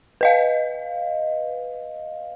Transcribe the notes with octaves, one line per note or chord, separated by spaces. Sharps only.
B4 D#5 F5